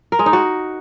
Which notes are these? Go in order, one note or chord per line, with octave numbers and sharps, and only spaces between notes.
A#4
G#3
D#4
F#4